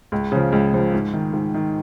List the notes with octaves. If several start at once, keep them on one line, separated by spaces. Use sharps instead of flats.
C#2
C#3 F3
C#2
C#3 F3
G#2
D#3
G#2
D#3